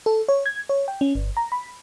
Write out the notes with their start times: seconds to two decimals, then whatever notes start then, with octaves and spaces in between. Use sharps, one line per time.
0.06 A4
0.28 C#5
0.46 G#6
0.69 C#5
0.88 G5
1.01 C#4
1.15 G1
1.37 A#5
1.52 B5